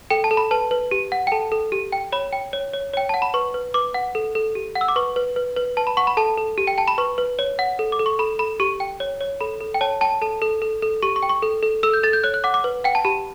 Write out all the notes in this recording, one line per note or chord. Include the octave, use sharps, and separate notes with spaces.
A4 G5
A5
A4
B5
B4 A5
B4
G4
F#5
G5
A4 A5
A4
G4
G5
C#5 B5
G5
C#5
C#5
C#5 G5
F#5 A5
B5
B4 C#6
B4
B4 D6
F#5
A4
A4
G4
F#5
E6
D6
B4 C#6
B4
B4
B4
B4 A5
B5
F#5 C#6
B5
A4 A5
A4
G4
G5
G5 A5
B5
B4 C#6
B4
C#5
F#5
A4
D6
A4
C#6
A4 B5
A4 B5
G4 C#6
G5
C#5
C#5
A4 B5
A4
G5
C#5 A5
G5 A5
A4 A5
A4
A4
A4
G4 C#6
C#6
G5
C#6
A4
A4
A4 E6
G6
A4 A6
G6
C#5 F#6
F#6
F#5 D6
D6
B4
F#5 G5
A5
G4 B5